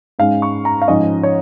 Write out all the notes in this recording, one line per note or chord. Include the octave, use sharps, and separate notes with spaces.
G#2 G#3 C#4 F5
C#6
A#5
F5
G#2 F3 C#4 D#5
C#5